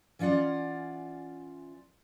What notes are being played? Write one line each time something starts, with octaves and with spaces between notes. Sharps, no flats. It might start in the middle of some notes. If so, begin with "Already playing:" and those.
E3 C#4 F4 D5 F#5